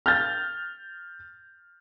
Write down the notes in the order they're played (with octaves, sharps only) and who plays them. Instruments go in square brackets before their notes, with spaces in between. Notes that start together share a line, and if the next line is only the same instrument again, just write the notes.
[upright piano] F6 G6 A6